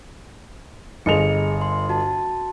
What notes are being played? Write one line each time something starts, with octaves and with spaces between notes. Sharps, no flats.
G1 G#4 D#5 C#7 F7
C6
F#4 A5